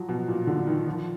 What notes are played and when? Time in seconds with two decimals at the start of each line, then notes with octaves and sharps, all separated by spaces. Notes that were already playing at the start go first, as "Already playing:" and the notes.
Already playing: F3 F#3
0.09 B2
0.28 A#2
0.47 D3
0.67 D#3
0.86 F3